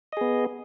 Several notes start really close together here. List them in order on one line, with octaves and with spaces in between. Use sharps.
D#5 G#4 B3